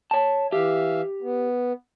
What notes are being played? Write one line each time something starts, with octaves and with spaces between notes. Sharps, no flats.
C#5 A5
E3 G4 E5 F5
B3